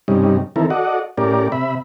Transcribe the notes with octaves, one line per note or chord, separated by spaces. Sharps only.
G2 C3 G3 C#4 D#4
D#3 E3 C4 E4 A4 A#4
F#4 A4 D5 D#5 F#5
A2 C#4 G4 A#4 D5
C3 E5 B5